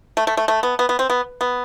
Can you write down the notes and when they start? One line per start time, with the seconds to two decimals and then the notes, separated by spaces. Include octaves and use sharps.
0.17 A3
0.27 A3
0.37 A3
0.48 A3
0.63 B3
0.79 B3
0.89 B3
0.99 C4
1.10 B3
1.41 B3